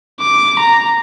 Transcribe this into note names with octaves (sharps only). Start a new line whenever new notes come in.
D6
A#5